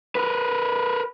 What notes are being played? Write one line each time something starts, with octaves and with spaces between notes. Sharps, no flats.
A#4 B4